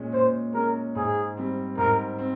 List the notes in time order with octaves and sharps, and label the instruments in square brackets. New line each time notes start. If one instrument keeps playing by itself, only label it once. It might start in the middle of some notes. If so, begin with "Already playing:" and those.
Already playing: [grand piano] A#2 G#3 C#4
[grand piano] A#2 [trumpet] C5
[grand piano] G#3 C#4 [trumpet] A#4
[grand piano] G#2 [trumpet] G#4
[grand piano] G3 C4
[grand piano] G#2 [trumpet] A#4
[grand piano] C4